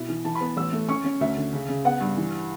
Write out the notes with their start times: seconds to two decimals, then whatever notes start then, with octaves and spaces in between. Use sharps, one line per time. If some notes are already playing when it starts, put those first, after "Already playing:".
Already playing: B2 E4
0.08 E3
0.25 E3 A5
0.35 B5
0.41 B3
0.57 A1 E6
0.73 A3
0.89 C#4 C#6
1.04 C#4
1.21 D2 E5
1.36 D3
1.53 C#3
1.69 C#3
1.85 B3 F#5
2.01 G2
2.17 E3